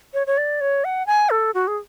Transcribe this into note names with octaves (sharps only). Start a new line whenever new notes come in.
C#5
C#5
D5
C#5
F#5
G#5
A4
F#4
G#4